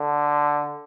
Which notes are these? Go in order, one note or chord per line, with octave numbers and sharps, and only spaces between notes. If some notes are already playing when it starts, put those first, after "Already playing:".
Already playing: D3